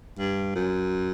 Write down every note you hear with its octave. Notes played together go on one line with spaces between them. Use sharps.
G2
F#2